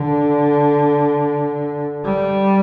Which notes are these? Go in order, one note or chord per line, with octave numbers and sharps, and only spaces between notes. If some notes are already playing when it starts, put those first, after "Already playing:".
Already playing: D3
G3